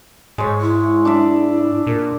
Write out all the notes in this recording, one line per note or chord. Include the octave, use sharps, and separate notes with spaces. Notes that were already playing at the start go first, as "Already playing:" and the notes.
G#2 G#3 C#5
E4
D4 D5 E5
A#2 A#4